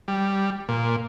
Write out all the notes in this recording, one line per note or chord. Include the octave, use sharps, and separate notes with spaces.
G3
A#2